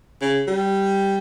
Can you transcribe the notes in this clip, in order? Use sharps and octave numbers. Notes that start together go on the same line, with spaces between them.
C#3
G3